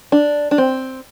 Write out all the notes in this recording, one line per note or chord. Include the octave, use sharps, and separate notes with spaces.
D4
D4
C4